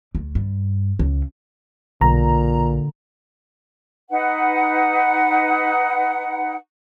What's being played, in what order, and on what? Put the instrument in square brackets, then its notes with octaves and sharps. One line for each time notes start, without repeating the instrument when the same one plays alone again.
[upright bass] D2
G2
C#2
[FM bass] B1 [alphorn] A#2 [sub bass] D3 [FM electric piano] A#5
[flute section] D#4 B4 F#5